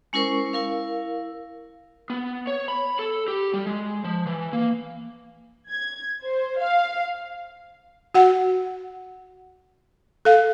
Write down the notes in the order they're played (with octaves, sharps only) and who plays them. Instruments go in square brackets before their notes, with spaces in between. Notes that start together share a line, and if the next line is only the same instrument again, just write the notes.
[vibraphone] G#3 C#4 E4 A#4 C5 C#6
E4 A#4 F5
[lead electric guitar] B3
C#5
B5
A4
G4
G3
G#3
F3
E3
A#3
[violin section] G#6
C5
F5
[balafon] F#4 F#5
A4 F5